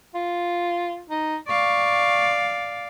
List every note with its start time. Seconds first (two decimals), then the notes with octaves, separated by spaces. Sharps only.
0.15 F4
1.10 D#4
1.48 D5 F5 C#6